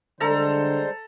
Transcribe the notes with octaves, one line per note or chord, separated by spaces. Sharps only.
D3 G3 G#3 A4 C5 A#5